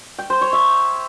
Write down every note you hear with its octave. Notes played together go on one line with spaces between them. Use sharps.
G5
C5
C#5
E5